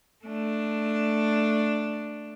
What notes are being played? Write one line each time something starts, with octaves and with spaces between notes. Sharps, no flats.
A3 D4